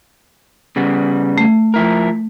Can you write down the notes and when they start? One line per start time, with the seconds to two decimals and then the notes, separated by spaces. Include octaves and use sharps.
0.76 C#3 G3 B3
1.38 A3
1.74 F3 E4 A#4